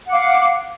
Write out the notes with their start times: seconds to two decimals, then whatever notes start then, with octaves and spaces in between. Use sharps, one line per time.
0.06 F#5
0.09 D6
0.12 F5